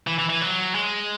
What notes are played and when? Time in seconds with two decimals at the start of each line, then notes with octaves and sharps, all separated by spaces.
0.07 E3
0.19 E3
0.29 E3
0.41 F#3
0.75 G#3